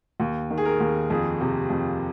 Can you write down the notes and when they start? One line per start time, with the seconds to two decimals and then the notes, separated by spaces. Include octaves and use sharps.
0.20 D#2
0.51 D#3
0.58 G#4
0.65 A#4
0.80 D#2
1.10 F2 G#4
1.41 C3
1.70 F2